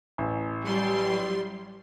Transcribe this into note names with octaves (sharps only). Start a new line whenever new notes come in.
A1
F#3 G3 C6